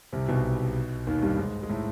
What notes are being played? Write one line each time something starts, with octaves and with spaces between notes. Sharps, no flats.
C2 C3
B1 B2
D#2 D#3
G2 G3
G#2 G#3
G#3
A2 A3